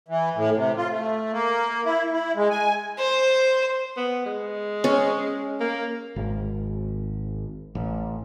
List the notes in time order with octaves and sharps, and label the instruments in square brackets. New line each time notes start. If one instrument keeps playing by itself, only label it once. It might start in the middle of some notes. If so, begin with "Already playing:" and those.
[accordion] E3
A2
C3
F4
A3
A#3
E4
E4
G#3
G#5
[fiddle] C5
[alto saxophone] B3
G#3
[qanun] C#4
[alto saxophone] A#3
[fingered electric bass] G#1
A1